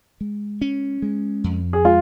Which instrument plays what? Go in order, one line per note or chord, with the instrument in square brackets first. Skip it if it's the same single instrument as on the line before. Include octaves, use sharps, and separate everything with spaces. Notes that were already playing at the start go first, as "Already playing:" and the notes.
[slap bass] G#3
C#4
G#3
F2
[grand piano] G#4
[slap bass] G#3 [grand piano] F4